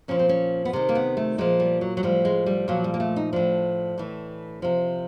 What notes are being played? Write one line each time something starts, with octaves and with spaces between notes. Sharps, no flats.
A#2 F3 C#4
C4
C#4
B3
C3 D#3 C4
A#3
B3
A3
A#2 F3 G#3
G3
F#3
F#3
A2 F3 G3
G#3
G3
A#2 F3 F#3
G3
A#3
A3
D#4
A2 F3 D4
A2 E3
C3 F3